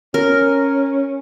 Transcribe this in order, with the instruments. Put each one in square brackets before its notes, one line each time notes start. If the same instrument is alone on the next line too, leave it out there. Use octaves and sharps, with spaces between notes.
[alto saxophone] C#4 [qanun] A#4